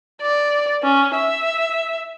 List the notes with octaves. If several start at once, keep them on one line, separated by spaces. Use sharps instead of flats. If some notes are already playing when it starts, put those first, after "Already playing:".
D5
C#4
E5